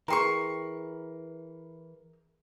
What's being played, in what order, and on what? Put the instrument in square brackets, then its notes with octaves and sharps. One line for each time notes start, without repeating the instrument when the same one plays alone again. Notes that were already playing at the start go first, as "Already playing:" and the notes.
[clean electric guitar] E3 [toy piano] G#4 G5 A#5 [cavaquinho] A#4 C6 C#6